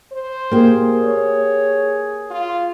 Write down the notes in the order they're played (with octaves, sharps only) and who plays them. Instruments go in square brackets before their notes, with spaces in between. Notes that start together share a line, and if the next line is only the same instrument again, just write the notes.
[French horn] C5
[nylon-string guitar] A#3 G4 [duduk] G#4
[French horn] C#5
F4